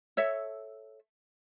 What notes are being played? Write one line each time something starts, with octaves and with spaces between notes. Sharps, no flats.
A4 C#5 E5